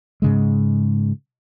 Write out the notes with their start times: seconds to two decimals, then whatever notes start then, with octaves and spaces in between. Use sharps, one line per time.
0.22 G#2 C#3 G#3